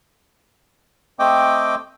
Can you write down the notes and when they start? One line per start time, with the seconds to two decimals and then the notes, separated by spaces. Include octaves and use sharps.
1.19 A3 C4 D#5 G5 D6